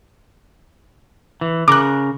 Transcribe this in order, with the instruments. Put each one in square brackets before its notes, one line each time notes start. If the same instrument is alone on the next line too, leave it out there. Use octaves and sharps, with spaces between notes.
[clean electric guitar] E3
[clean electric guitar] C#3 A#4 [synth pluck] D6 F#6